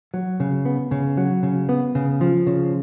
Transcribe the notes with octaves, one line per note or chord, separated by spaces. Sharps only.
F#3
C#3
B3
C#3
F#3
C#3
B3
C#3
F3
C#3